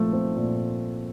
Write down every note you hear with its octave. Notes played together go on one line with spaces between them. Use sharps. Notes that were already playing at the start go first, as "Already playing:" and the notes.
Already playing: A#2 F3 A3 C4
C4
A#2